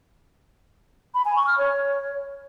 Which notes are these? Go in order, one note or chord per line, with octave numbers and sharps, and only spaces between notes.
B5
G#5
C#6
F6
C#5